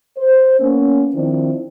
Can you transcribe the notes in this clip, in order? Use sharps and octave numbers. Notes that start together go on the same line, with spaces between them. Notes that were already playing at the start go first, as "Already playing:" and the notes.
C5
A#3 B3 C#4
D#3 F3 C4 D4 E4